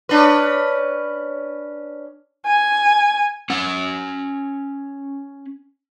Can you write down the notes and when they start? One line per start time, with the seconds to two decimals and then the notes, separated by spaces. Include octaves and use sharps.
0.09 C#4 D4 B4
2.46 G#5
3.50 C#4 F#5